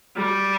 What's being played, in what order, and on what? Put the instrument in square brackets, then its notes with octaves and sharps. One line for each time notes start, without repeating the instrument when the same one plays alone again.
[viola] G3